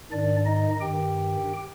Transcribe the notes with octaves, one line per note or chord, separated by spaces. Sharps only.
G#2 D#3 D4 D5
D#4 D#5
G2 D#3 G4 G5